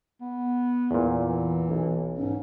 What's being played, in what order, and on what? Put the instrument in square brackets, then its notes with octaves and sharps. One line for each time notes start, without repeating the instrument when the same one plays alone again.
[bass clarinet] B3
[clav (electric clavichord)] E2 A#2
[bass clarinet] E3
[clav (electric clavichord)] B1
[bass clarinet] G#2 [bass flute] C#4